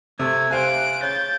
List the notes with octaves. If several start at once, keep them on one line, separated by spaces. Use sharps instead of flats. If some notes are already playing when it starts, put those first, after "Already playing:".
C3 A3 G#6
C3 C5 F5 G#5 F#6 D7
C#3 G6 A6